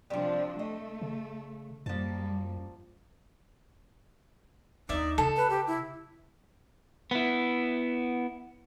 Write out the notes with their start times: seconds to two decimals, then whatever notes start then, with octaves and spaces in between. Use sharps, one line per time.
0.10 C3 F3 G3 C4 D4
0.59 A3 D#5
1.02 C#3
1.86 F#2 F3 G3 A#3 A5
4.89 D#2 D4 D#4 D5 E5
5.18 C#3 A4
5.37 B4
5.50 G4
5.67 E4
7.11 B3 E4